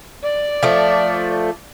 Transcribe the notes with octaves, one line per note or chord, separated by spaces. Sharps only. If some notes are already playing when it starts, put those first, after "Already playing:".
D5
F3 A3